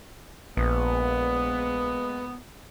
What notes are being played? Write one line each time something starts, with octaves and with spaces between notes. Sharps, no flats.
A#1 G#3 A#3 B3